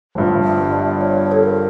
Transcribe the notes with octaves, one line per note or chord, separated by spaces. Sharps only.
G1 G2 F3
E5
D5
C#5
A4
A#4